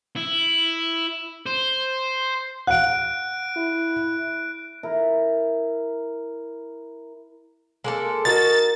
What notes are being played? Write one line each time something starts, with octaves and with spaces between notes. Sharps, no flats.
E4
C5
F5 F#5 F#6 D7
E4
E4 A#4
G#3 A#3 A4
D#4 F#4 A#4 A6